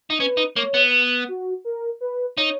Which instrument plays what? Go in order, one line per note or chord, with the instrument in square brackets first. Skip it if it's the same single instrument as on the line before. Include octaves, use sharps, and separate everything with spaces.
[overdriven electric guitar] D#4
[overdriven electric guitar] C#4 [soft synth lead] B4
[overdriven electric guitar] D#4
[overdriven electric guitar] A#3 [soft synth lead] C#5
[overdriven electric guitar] B3
[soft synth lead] F#4
A#4
B4
[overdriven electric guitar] D#4 [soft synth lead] C#5